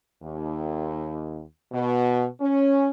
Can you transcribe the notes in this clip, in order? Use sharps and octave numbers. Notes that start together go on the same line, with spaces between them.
D#2
B2
C#4